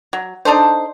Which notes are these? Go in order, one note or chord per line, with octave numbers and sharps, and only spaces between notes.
F#3
D4 D#4 A4 C5